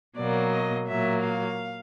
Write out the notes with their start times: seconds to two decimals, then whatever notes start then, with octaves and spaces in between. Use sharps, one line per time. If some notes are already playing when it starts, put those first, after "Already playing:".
0.16 B2 F#3 A#3 D5
0.51 D#5
0.87 A#2 F#3 A#3 E5
1.22 F5